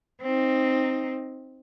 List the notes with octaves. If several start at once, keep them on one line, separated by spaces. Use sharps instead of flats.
C4 D#4